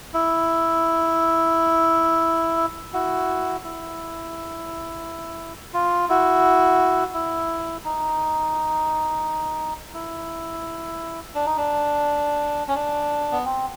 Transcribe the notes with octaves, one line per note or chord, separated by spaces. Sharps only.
E4
E4 F#4
E4
F4
E4 F#4
E4
D#4
E4
D4
D#4
D4
C#4
D4
B3
C4